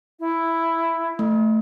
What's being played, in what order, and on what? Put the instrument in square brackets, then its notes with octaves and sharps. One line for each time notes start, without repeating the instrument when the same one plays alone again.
[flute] E4
[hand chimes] A3